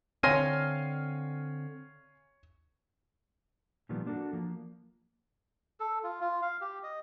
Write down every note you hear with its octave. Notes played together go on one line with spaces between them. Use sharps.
D3 C4 C#5 F5 G#5 C6 A#6 D#7
A#2 D#3 F3 G3 B3
A#3 D4 F#4 A4
F3 A#3
A4
F4
F4
F5
G4
D#5